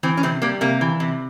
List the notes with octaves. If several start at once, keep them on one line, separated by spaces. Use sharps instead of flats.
E3 C4
C#4
C3 C4
G3 A#3
C3 A#3
E3
C3